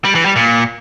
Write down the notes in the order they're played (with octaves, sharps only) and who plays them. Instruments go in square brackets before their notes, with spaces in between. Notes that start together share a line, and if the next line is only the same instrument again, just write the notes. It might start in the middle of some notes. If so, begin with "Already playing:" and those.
[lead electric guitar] G3
E3
G3
A#2